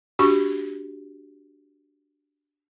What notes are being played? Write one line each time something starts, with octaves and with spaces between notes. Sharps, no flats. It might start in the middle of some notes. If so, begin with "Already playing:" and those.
D4 F#4 G4 C#6